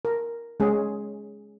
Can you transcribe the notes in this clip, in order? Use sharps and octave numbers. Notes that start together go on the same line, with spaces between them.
A#4
G#3 C#4 G#4